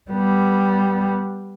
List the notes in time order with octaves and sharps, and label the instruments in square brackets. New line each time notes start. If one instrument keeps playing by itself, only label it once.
[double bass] G3 B3